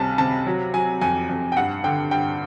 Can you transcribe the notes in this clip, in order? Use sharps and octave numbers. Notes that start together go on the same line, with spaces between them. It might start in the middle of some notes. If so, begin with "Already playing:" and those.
Already playing: C#2 C3 G3 G#5 A5
C3 A5
F#3
F#3 G#5
F2 G#5
F2
G5
G2 F#5
D3 G5
G2 G5